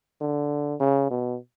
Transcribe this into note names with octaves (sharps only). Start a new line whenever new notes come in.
D3
C#3
B2